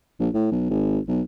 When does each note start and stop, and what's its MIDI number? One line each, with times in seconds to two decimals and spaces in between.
0.20 0.29 34
0.34 0.47 45
0.52 0.69 35
0.70 0.99 32
1.08 1.21 35